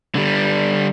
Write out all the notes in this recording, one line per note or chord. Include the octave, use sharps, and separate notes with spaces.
D3 G3